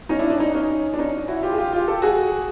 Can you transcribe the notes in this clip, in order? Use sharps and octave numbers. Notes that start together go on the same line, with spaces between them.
C#4 D#4
D4 E4
D4
C#4 D#4
C#4 D#4
D4
C#4 D#4
E4 F#4
F4 G4
G#4
F4 G4
F4 G4
G4 A4
F#4 G#4